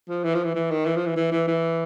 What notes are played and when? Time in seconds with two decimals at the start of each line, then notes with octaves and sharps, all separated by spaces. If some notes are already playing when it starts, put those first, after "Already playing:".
0.09 F3
0.24 E3
0.34 F3
0.44 E3
0.55 E3
0.70 D#3
0.86 E3
0.96 F3
1.06 E3
1.16 E3
1.32 E3
1.47 E3